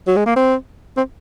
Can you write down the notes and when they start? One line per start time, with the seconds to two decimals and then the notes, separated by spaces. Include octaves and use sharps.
0.07 F#3
0.16 G#3
0.26 A#3
0.36 C4
0.97 C4